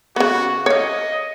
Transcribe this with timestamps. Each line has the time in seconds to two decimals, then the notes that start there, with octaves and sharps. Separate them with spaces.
0.16 C#3 B3 F#4
0.66 C#5 D#5 F5